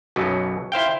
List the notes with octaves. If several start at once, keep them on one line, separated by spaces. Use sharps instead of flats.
B1 F#2 B2 F#3
E4 C5 F5 G5